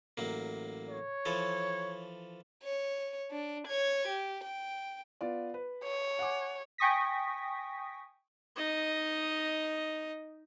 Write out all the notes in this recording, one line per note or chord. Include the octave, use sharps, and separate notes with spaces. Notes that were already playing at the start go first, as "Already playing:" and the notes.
A1 F#3 A#3
C#5
E3 F3 A4
C#5
D4
C#5 G#6
G4
G5
B3 F4 D5
B4
C#5
F#5 G#5 D6
G5 G#5 C#6 D#6 A#6 B6
D#4 D#5